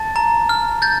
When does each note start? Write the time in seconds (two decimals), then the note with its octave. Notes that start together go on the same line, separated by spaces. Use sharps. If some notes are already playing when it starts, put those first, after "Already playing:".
Already playing: A5 A6
0.16 A#5
0.49 F6
0.82 G6 A6